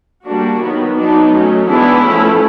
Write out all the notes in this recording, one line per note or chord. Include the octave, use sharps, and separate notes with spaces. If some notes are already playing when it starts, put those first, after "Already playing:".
G3 A#3 D4 F#4
D#3 F#3 B3
F#3 B3 D4 D#4
F#3 A3 C#4
E3 G#3 B3 D4 E4
F3 A3 C#4